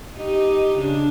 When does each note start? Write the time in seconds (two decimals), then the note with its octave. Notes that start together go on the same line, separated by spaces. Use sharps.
0.15 D#4 G4 D#5
0.78 C#3 D4